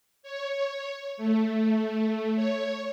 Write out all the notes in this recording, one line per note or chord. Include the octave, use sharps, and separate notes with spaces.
C#5
A3
C#5